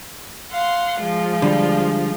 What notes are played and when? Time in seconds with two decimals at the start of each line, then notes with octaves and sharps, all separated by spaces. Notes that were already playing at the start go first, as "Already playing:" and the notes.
0.52 F5 F#5 C6
1.01 F3 G#3 F4
1.42 D3 G3